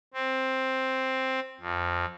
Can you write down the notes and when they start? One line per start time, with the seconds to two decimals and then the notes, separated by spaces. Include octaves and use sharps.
0.14 C4
1.60 F2